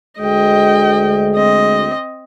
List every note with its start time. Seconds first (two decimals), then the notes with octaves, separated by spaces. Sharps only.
0.20 D2 G#3 D#5 G5
1.35 C4 D#5